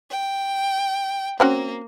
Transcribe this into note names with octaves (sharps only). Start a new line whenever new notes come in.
G5
A#3 C4 C#4 F#4